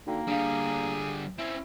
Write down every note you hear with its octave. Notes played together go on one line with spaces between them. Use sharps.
D3 A#3 D#4 F#4 G5
D3 G3 D4 G#4 F5
C4 C#4 E4